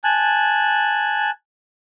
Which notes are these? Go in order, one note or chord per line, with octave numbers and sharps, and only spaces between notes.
G#5 A5 F#6